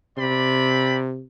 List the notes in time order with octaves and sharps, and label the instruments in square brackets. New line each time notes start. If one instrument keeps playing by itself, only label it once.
[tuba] C3 [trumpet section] C4 D5 B5